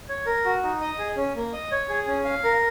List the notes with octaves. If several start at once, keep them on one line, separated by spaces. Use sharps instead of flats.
C#5
A#4
F#4
D#4
D#5
G#4
C#4
A#3
D#5
C#5
G#4
C#4
F5
A#4